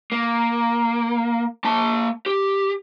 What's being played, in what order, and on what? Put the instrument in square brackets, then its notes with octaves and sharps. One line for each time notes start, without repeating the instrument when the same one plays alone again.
[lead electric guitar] A#3
A#3 A5
G4